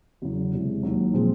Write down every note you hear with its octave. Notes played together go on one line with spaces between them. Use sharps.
E2 C#3 F#3
E1 E2 C3
D#2 D#3 F#3
A#2 F3 G#3 C4